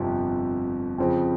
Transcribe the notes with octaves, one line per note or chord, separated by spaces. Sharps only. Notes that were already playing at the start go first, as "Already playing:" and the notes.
Already playing: G1 F2 C3 F3
F2 C#3 F3 C4